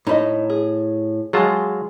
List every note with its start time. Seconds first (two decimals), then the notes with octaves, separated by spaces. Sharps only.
0.07 A2 D#4 D#5 B5
0.50 G#4
1.33 F#3 G#3 F4 G#4 A5